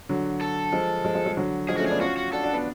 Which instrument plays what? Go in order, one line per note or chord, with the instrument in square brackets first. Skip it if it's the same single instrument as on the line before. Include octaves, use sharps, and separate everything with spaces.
[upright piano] D3 F#3
[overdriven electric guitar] A4
[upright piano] F3 G#3
F3 G#3
F3 G#3
F3 G#3
D3 F#3
[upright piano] F3 G#3 [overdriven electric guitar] G#4
[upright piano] A3 C#4 [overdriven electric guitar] F#4
[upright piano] B3 D4 [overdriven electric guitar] G#4
[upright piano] C#4 F4 [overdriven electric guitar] F#4
[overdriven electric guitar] F#4
[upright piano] D4 F#4 [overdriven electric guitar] A4
[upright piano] D4 F#4
B3 D4